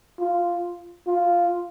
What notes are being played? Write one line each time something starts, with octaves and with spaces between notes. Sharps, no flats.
F4
F4